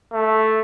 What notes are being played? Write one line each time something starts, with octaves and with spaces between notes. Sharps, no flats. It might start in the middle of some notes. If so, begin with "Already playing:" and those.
A3